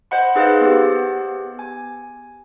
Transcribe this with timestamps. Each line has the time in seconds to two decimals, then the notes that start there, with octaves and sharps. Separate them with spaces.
0.11 C5 D#5 F#5 B5
0.35 D#4 G#4 B4 C5 D#5 F5
0.61 B3 G4
1.59 G#5